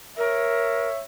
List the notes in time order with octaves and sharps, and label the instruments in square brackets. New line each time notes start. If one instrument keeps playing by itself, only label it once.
[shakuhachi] A#4 [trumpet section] C#5 E5